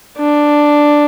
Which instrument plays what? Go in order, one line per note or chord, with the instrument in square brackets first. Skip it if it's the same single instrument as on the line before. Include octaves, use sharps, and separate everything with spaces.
[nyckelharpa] D4